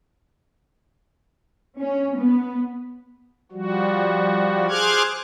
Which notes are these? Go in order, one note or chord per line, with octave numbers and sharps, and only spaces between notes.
C#4
B3
F3 G3 F#4
G#4 C5 D6 F6 F#6 G#6